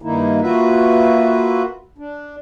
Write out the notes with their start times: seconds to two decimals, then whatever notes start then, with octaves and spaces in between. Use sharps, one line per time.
0.02 G2 D#3 A#3 D#4 E4
0.41 A#3 F4 F#4 B4 E5
1.98 D4